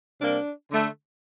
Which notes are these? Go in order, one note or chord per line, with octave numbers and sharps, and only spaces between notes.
C3 G3 A#3 D4
D3 A3